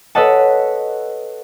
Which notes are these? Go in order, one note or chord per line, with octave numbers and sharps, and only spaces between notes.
A4 B4 C#5 D#5 F#5 A5